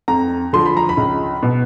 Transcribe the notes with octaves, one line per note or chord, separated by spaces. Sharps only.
F2 A#5
D3 F3 C6
B5
A#5
B5
C#2
B2